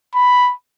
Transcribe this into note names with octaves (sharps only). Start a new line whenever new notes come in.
B5